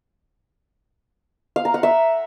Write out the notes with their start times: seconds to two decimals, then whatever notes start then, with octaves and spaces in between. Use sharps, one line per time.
1.56 F5
1.65 A#5
1.74 F#5
1.83 E5